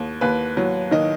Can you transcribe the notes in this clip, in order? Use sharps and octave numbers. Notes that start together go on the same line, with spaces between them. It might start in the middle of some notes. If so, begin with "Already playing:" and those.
Already playing: D#2
D#2 B4
F#3
D#3 D#5